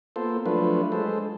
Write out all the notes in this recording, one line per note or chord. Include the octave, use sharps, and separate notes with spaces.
A#3 B3 F4 A4 C5
F3 F#3 A3 D4 F4 B4
G#3 A4 C5